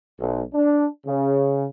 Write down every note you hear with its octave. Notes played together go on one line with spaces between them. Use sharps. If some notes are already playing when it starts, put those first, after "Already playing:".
B1
D4
C#3